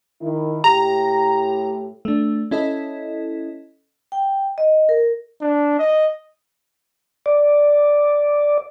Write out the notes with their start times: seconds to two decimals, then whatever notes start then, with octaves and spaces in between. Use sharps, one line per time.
0.21 D#3 E4
0.64 A2 G4 A#5
2.05 A3 D4
2.51 C#4 E4 A4 D#5
4.12 G5
4.58 D#5
4.89 A#4
5.41 D4
5.79 D#5
7.26 D5